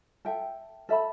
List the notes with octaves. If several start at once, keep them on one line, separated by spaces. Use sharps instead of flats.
A4 E5 G5
A4 E5 B5